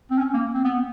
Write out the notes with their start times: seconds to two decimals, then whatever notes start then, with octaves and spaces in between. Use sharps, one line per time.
0.11 C4
0.18 C#4
0.34 A#3
0.54 C4
0.64 B3